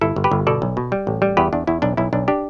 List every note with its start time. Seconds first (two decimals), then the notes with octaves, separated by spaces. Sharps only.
0.01 G1 E4 A4
0.16 G1
0.24 G4 B4
0.31 G1
0.47 B2 A4 D5
0.62 B1
0.77 B2
0.92 G3
1.07 A1
1.22 G3
1.37 E2 G4 B4
1.53 E2 D4
1.67 E2 E4
1.82 B1 D4
1.97 B1 E4
2.13 B1 D4
2.28 D4 G4